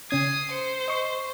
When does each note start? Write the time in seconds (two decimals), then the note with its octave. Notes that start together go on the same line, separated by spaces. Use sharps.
0.10 C#3 C#4 D#6 G#6 C7
0.51 C5 C#7
0.88 D#5 C#6